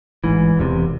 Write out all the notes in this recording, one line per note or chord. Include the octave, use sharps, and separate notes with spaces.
A1 G#2 E3
E1 E2 C3